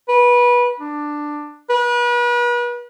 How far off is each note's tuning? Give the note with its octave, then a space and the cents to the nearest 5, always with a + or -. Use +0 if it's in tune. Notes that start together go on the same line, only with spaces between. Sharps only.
B4 -20
D4 +10
B4 -35